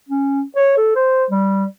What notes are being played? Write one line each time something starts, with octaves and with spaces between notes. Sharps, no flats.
C#4
C#5
A4
C5
G3